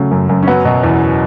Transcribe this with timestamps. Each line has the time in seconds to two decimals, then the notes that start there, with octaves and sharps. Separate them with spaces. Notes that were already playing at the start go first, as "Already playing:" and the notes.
Already playing: C#3 F#3 A3
0.11 F#2
0.29 F#2
0.43 C#4
0.48 F#3 B3
0.65 B2
0.83 E2